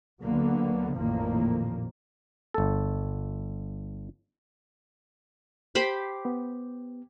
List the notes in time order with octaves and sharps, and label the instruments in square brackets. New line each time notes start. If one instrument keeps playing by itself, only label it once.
[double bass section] D2 D3 F#3 A#3 B3
A1 F2 A#2 D#3 F3 A#3
[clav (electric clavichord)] G1 A4
[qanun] G4 C5 B5
[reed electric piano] B3